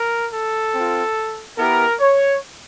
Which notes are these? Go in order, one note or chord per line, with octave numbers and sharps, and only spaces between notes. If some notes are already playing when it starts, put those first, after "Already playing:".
Already playing: A#4
A4
C4 F4
B3 E4 G4 A#4
C#5